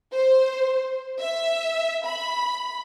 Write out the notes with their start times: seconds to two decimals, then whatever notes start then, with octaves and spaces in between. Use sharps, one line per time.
0.12 C5
1.21 E5
2.06 B5